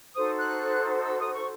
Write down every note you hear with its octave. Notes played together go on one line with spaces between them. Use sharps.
D#4 F#4 A4 C5 D#6
F#6
E6
D#6
C#6